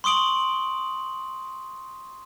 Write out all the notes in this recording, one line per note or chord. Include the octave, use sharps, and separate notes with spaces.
C6 C#6 D#6 D7 F#7